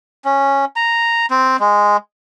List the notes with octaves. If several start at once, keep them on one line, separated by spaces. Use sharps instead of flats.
C#4
A#5
C4
G#3